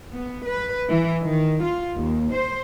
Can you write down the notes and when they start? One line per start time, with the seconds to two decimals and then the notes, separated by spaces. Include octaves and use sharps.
0.14 B3
0.48 B4
0.89 E3
1.22 D#3
1.63 F4
1.96 D#2
2.32 C5